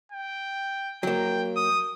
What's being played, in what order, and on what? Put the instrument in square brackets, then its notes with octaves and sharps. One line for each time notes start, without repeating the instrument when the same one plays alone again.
[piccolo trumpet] G5
[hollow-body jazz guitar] F#3 A#3 [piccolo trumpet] G5
[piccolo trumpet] D#6